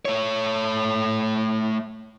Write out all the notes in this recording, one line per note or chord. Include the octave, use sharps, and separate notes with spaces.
A3 C#5